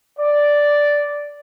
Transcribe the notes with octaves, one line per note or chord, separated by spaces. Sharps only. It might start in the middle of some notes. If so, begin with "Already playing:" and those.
D5